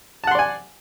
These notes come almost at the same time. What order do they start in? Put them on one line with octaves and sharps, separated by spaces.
A5 F#5 C6 D5 G#5